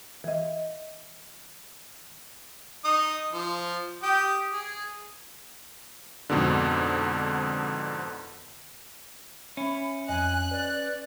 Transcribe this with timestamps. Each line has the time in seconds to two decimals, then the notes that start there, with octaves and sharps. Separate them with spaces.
0.24 E3 D#5
2.85 D#4 D#6
3.32 F3
4.03 G4 G5 D#6
4.53 G#4
6.30 F2 G#2 B2 D3
9.57 C#4 E5 B5
10.08 F2 D#5 G#5 F#6
10.51 B4 D5